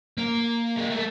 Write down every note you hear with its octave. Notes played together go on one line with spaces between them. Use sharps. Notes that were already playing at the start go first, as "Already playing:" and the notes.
A#3
G#3
A3